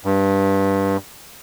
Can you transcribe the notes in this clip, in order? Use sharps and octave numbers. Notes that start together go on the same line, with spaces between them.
G2